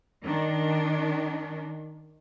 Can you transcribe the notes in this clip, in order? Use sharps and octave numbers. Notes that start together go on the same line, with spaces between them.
D#3 D4